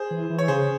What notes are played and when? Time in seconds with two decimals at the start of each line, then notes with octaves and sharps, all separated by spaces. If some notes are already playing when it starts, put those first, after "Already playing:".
Already playing: G#4 C5
0.10 E3
0.30 E3
0.39 C#5
0.48 C#3 G#4 C5